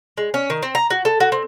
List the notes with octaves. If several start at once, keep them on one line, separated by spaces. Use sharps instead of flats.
G#3
C#4
D#3
C4
A#5
F#4
A4
F#4
C4